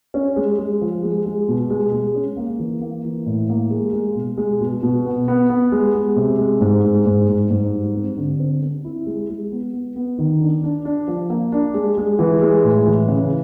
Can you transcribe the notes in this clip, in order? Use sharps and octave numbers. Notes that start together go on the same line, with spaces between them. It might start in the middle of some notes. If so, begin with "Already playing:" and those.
C#4
G#3
G#3
F3
G#3
G#3
B2
G#3
G#3
C#4
A#3
E3
A#3
E3
A2
A#3
G#3
G#3
B2
G#3
B2
B2
B3
B3
B3
G#3
G#3
C3
G#3
G#2
G#3
G#2
G#2
G#2
G3
C4
D3
C4
C4
E4
G#3
G#3
B3
B3
B3
D#3
D4
D4
D4
F3
A#3
D4
G#3
G#3
E3
G#3
A2
E3
C#3